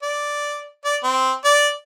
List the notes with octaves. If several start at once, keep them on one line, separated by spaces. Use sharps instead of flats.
D5
D5
C4
D5